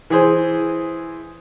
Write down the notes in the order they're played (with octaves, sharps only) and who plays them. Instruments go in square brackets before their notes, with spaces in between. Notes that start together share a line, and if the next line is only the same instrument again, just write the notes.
[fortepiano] E3 G#4 C5